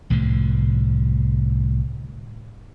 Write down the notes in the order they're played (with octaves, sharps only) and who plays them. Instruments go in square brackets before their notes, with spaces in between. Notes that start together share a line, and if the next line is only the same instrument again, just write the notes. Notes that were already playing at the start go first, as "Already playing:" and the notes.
[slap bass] C2 A2 D3 F3